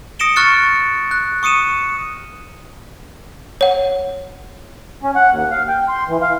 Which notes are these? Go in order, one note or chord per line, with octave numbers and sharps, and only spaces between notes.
D#6 A#6 C#7 D7 E7 G7
C#6 F6 F#6 A6 C#7
F#6
C#6 D#6 C#7 D#7 E7
C#5 F#5
C#4
F#5
D#2
F5
G5
C6
E3
F5